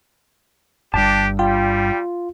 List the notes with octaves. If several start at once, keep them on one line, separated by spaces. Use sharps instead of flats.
G1 G2 D4 G4 A5
G3 F4 G5